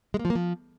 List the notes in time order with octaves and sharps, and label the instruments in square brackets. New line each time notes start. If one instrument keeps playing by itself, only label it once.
[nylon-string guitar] G#3
A#3
F3
A#3
F3